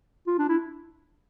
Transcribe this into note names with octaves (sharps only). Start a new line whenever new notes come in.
F4
D4
E4